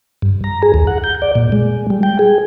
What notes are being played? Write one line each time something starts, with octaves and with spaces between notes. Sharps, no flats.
G2
A#5
G#4
D#2
F#5
G6
D5
A#2
G#3
G3
G5
G#4